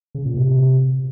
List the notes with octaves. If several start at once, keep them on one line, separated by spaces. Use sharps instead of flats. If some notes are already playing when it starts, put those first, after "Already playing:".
C#3
A#2
C3